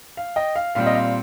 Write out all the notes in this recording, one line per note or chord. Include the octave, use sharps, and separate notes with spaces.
F5
D#5 G5
F5
A#2 G3 C4 F5
D#5
F5